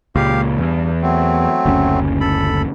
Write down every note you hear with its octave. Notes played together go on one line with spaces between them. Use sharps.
C#2 A#2 G4 F5
E2 G2
F#3 A3 C4
F#1 D2 C#4
A4 B5